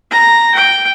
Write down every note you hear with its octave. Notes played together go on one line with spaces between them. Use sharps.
A#5
G5